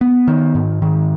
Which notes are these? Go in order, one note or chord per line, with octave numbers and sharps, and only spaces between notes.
B3
D#3
G#2
D#3